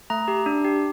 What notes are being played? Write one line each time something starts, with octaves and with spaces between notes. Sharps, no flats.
A3 A#5
G4
D4
G4